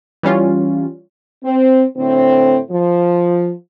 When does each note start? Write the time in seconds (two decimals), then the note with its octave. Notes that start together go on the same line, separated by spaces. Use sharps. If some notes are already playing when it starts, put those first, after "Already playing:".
0.23 E3 G3 C#4 F4
1.44 C4
1.97 A2 D3 C4
2.70 F3